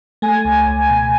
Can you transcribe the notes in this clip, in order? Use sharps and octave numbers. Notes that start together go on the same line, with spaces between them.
A3 G#5
C#2
C#2
B2